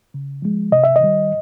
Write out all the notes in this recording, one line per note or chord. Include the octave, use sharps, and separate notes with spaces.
C#3
F3 G#3
C3 D#5
E5
D#5
D#3 G3